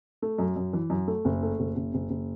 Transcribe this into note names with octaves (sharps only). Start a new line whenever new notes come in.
A3
F#2
F#2
E3
F#2
A3
F#1
A3
F#1
F#1
F#1
F#1